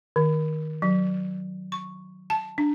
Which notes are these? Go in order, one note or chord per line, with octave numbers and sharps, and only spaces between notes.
D#3
F#3
C#6
A5
D4